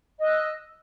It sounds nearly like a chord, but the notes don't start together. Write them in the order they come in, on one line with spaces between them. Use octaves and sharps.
D#5 F#6 E6